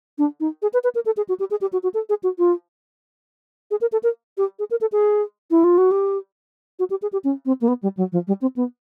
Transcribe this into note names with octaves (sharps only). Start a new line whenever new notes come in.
D4
D#4
G#4
B4
B4
A#4
A4
G#4
F#4
G4
G#4
G4
F#4
F#4
A4
G#4
F#4
F4
G#4
A#4
A4
A#4
G4
G#4
A#4
A4
G#4
E4
F4
F#4
G4
F#4
G4
G#4
G4
C#4
C4
A#3
B3
G3
F#3
F3
G3
C4
B3